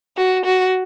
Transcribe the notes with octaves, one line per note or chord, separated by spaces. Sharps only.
F#4
F#4